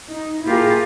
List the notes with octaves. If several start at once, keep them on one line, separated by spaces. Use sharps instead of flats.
D#4
A#3 E4 F4 G4 G#4 A#4